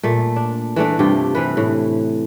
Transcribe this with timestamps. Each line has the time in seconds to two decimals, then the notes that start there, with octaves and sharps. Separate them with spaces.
0.03 A#2 A3
0.36 D4
0.76 E3 A3 D4
0.99 G2 C3 F4 G4
1.35 C3 E3 B4
1.57 A2